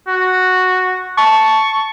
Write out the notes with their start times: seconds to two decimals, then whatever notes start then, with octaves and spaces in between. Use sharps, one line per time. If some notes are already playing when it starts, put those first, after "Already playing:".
0.07 F#4
1.18 A5 C#6